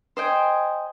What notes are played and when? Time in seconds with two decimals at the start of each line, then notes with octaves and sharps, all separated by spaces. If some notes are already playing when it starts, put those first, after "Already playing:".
0.17 C5 D#5 G5 G#5